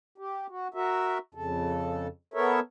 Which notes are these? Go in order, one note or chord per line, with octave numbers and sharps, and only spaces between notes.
G4
F#4
F#4 A#4 E5
F2 C#3 A4
B3 A4 A#4 C#5 E5